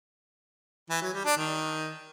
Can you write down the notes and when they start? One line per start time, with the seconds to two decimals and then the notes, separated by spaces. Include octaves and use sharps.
0.90 E3
1.02 F#3
1.13 G3
1.25 D4
1.37 D#3